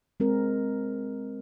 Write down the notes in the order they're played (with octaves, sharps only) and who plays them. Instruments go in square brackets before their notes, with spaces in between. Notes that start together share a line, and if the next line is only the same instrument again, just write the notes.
[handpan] G#3 C4 A#4